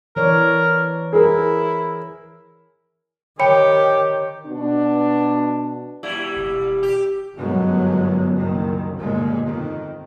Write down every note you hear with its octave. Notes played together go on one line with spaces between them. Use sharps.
E3 A#4 C#5 D5
E4 G#4 A#4
D#3 G4 C#5 G5 B5 C#7
B2 D4
A#2 G3 E4
E1
G4
G1 F#2 A2 F#3 G#3 B3
F#1 C2 D#3
G1 D#2 A#2 G#3
F2 D#3